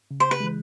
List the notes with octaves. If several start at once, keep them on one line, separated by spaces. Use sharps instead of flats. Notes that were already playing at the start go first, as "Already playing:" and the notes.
C#3
C5
B4
E3 G#3